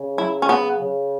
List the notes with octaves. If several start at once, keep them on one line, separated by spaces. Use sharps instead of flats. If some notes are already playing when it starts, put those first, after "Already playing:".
Already playing: C#3
F#3 E4
C#4
C#3 B3
C#3